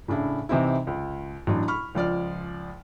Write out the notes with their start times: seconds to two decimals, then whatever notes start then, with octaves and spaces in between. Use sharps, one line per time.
0.08 A2 C#3 D4 E4
0.49 C3 E3 C4 D#4 E4
0.87 C#2
1.47 A1 F#3 D4
1.68 B5 C#6 F6
1.95 C#2 F3 D5 F6